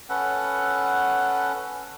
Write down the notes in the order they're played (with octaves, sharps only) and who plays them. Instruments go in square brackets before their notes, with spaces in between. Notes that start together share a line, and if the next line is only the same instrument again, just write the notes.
[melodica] C#4 A4 B4 F#5